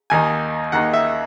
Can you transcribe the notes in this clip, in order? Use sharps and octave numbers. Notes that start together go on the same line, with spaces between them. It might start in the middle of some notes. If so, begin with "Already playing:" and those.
D#2 D#3 A#3 D#4 G#5
D#2 D#3 A#3 D#4 F#5
E5